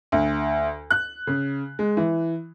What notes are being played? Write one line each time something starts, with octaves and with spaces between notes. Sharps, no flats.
D2
F#6
C#3
G#3
E3